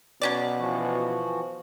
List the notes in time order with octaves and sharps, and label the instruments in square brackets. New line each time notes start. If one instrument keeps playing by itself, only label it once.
[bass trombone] B2 [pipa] F#3 C#4 D5
[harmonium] E3 F3 F#4